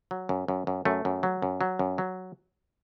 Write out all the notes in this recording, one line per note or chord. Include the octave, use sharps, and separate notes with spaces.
F#3
F#2
F#2
F#2
F#2 A3
F#2
F#3
F#2
F#3
F#2
F#3